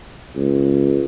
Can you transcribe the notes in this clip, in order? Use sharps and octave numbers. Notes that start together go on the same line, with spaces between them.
C#2